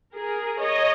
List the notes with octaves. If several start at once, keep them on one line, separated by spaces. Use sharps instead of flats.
G#4 A#4
C#5 D#5